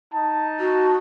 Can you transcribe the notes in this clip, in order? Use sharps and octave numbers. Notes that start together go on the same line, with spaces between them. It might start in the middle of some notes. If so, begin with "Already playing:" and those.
D#4 A5
F#4